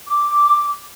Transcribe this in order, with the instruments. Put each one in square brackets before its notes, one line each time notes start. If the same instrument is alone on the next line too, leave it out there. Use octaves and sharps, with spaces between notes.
[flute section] D6